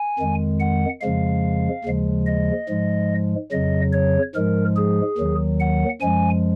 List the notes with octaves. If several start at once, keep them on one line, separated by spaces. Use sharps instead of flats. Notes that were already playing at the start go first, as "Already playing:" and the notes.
Already playing: G#5
F2 D#3 G#3
F#5
F2 C#3 F3 G#3 F5
D#2 C#3 F3 G#3
D#5
G#2 F3 G#3
F2 C#3 F#3 D#5
C#5
G#2 F3 G#3 A#4
G#4
D#2 D#3 F#3
F#5
F#2 F3 G#3 G#5